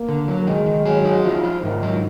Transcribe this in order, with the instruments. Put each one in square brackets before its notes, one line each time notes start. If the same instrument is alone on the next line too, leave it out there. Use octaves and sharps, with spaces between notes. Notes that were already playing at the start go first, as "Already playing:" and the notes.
Already playing: [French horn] A#3
[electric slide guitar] D3
F#3
[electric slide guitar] D#3 [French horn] G#3
[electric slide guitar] D#3
[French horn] F#3 [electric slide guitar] G#4
[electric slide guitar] D#4
[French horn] F3 [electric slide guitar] F4
[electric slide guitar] F4
[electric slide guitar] G#2 [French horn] D#3
[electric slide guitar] F#3